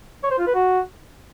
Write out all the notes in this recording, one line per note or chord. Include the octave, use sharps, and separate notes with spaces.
C#5
C5
F4
B4
F#4